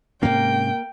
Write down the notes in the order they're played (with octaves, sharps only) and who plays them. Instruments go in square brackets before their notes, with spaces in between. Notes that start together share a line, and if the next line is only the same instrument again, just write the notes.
[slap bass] G#2 C3 C#4 [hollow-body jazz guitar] A#3 [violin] G5